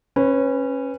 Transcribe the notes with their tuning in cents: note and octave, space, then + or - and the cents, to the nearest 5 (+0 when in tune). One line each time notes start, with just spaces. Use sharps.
C#4 -20 B4 +5